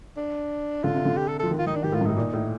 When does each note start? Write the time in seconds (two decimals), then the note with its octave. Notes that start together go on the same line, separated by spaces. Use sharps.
0.17 D4
0.83 D3 F4
0.94 C3
1.05 D3
1.17 G4
1.28 A4
1.39 F3 A4
1.51 D#3
1.58 F4
1.66 D#3 D#4
1.75 D4
1.84 D#3 G4
1.92 A2 F4
2.01 G2
2.06 A2 D#4
2.16 A#2
2.33 A2